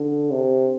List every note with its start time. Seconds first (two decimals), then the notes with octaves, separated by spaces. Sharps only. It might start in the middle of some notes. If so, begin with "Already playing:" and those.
Already playing: D3
0.31 C3